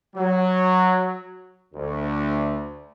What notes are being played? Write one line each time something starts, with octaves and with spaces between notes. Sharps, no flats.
F#3
D2